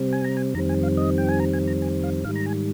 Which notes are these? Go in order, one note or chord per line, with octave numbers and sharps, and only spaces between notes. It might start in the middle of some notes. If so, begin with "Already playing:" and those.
Already playing: C3 G3 C4
G#5
A#5
G#5
F2 D#3 G3 C4 A#5
G#5
F5
D#5
G5
G#5
A#5
G#5
A#5
G#5
F5
G#2 D#3 G3 F5
A#5
G#5